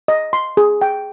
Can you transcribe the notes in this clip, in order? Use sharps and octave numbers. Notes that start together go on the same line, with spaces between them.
D#5
C6
G#4
G5